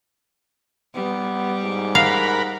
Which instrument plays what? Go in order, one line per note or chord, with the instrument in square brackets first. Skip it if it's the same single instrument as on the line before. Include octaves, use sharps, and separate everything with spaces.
[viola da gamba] G3 [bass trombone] B3
[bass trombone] G#2
[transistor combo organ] A#4 F#5 B5 [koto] F5